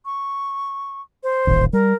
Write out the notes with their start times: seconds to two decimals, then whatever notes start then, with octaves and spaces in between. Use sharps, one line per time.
0.05 C#6
1.23 C5
1.47 D#1 A1 D#2
1.73 G3 A#4